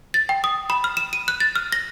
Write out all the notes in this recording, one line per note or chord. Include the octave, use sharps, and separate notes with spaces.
A6
G5
D#6
B5
F6
E7
D#7
F#6
A6
F6
A#6